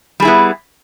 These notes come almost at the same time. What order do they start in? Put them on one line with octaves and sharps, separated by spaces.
G3 G#4 E4 B3